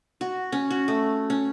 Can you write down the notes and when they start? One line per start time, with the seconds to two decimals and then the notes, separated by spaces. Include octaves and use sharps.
0.21 F#4
0.52 C#4
0.71 F#4
0.88 A3
1.30 C#4